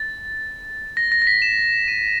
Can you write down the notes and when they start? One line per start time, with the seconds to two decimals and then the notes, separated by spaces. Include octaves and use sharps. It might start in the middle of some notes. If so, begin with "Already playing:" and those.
Already playing: A6
0.97 A#6
1.12 A#6
1.22 A#6
1.27 B6
1.42 E7
1.88 D#7